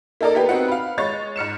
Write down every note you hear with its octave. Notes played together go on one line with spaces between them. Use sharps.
A#3 D#4 A4 A#4 D5
A#3 B3 G4 B4
B3 C4 D#4 F#4 F#5
F5 B5
G#3 C#5 C#6 A6
G#2 F6 C#7 E7